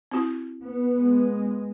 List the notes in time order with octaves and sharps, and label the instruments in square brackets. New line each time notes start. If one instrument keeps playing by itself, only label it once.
[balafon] C4 E4 F#4
[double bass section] B3
[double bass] G#3